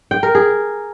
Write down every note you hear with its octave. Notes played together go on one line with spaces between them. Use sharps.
G5
A#4
G#4